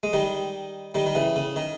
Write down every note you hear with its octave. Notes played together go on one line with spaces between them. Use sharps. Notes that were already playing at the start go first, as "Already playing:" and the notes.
G#3
D#3 G3
D#3 G3
D#3
C#3 E3
C#3
D#3